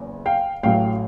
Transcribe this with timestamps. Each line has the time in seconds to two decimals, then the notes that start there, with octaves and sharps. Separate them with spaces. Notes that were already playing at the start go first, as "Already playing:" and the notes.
Already playing: F#1 E2
0.26 F5 G5
0.63 A1 A2 F#3 F5 G5